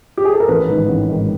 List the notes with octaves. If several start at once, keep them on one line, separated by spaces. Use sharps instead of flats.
G4
G#4
A4
A#4
A1 B4
G#2 D#3
A1
G#2 D#3